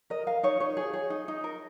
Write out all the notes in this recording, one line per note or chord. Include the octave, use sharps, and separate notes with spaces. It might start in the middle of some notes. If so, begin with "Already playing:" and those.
A#4 D#5
A#4 F5
D#4 C#5
D#4 C#5
G#4
G#4
D#4
D#4
A#4